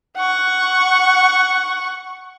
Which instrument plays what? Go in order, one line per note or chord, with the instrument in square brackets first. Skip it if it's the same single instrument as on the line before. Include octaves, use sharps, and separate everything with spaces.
[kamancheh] F#5 C#6